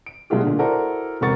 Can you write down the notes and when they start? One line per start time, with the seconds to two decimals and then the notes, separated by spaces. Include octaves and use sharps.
0.06 D7
0.30 B2 F#3 G#3 A3 F4 G4
0.44 A#2 D3
0.59 E4 F#4 A4 A#4 C5 D5
1.21 E1 C3 F#4 A#4 C#6 A6